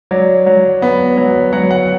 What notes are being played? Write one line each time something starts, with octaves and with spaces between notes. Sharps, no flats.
F#3 D5
F#3
B3
F#3
F#3 F#5
F#5